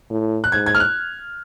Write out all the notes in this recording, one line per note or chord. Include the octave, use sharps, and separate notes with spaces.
A2
F#6
G#2 G#6
G#6
F6
F#6